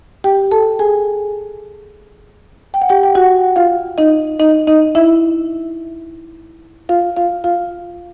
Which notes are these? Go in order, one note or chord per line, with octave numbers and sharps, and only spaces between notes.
G4 G5
A4 A5
G#4 G#5
G5
F#5
G4 G5
G5
F#4 F#5
F4 F5
D#4 D#5
D#4 D#5
D#4 D#5
E4 E5
F4 F5
F4 F5
F4 F5